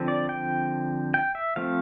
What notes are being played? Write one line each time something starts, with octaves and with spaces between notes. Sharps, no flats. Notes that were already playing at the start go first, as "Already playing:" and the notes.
Already playing: D3 F3 C4
D5
G5
G5
E5
F3 A3 C4 F5